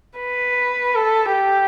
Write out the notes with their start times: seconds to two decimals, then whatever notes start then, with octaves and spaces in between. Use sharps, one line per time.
0.19 B4
0.94 A4
1.32 G4